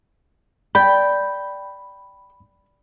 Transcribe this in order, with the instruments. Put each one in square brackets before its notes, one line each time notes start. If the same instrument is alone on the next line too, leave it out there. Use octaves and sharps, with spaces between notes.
[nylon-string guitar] D5 [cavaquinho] G5 [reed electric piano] B5